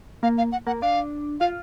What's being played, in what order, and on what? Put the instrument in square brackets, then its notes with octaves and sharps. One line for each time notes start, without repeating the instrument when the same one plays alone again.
[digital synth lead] A#3 [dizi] F5
[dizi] F5
F#5
[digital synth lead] A#3 [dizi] F#5
[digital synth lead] D4 [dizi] F5
[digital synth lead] F4 [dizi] F5